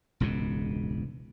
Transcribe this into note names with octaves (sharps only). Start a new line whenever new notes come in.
E1 C#2 G#2 B2